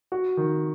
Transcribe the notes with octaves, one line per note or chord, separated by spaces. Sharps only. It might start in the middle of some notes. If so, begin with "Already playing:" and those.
F#4
D#3